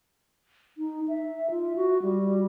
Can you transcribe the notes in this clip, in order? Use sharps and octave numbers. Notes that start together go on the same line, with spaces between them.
D#4
E5
F4
F#4
G3